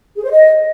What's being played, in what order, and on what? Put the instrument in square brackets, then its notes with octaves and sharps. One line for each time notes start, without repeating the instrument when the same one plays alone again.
[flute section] G#4
C5
D#5